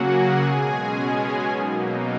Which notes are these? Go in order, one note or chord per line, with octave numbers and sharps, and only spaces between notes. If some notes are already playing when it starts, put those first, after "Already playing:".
Already playing: C#3 F#3 A#3 F#4 G#4 F#5 G#5
B2 G#3 C#4
B2 F#3 A#3 D#4